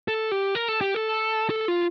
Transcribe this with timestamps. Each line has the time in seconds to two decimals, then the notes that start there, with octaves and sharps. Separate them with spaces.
0.08 A4
0.32 G4
0.55 A#4
0.68 A4
0.81 G4
0.94 A4
1.50 A4
1.68 F4